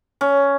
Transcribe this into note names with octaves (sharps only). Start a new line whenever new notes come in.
C#4